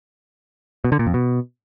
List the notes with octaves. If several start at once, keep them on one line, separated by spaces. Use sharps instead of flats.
B2
D3
A#2
F2
B2